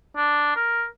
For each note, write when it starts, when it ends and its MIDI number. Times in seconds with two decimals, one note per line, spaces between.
0.17 0.56 62
0.56 0.85 70